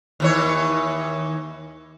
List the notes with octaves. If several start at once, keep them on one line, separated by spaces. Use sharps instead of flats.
D#2 E3 C#5